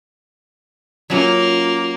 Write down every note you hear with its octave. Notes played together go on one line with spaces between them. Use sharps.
F#3 A#3 C#4 F4